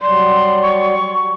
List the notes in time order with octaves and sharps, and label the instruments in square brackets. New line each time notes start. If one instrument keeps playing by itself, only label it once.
[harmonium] F#3 G3 D5 [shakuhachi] C6
[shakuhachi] C#6